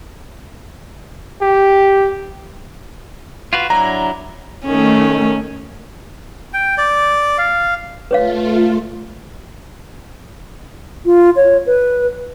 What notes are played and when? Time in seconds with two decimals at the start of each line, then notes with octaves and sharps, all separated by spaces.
1.41 G4
3.53 F4 F#4 B4
3.70 F#3 D4 E4 A#5
4.66 D#3 A3 C#4
6.53 G5
6.78 D5
7.38 F5
8.11 A3 F4 B4 C#5 F5
11.05 F4
11.36 C#5
11.66 B4